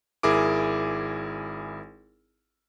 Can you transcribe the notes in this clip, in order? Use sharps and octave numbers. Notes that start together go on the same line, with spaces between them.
G#1 E4 G#4 A#4 D6